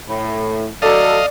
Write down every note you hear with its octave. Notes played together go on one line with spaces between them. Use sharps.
A2
F#3 A4 D5 D#5 F5